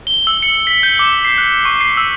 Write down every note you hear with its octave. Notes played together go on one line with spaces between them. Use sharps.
G7
E6
C#7
B6
G6
D6
C7
F#6
C#6
C7
E6